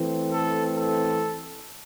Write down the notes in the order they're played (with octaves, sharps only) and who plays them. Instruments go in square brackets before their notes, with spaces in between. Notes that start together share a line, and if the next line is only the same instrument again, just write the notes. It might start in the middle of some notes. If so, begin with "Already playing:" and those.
Already playing: [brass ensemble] E3 A3 C4
A4
A4